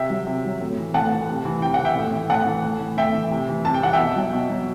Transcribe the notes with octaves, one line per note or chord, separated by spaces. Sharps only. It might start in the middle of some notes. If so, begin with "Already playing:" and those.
Already playing: C3 E5 G5
F#3
C3
F#3
A2
E3
A2 F#5 A5
E3
C3
E3
C3 G5
E3 F#5
E5 G5
A2
E3
A2 F#5 A5
E3
A2
E3
A2 E5 G5
E3
C3
E3
C3 A5
G5
E3 F#5
E5 G5
B2
F#3
B2
F#3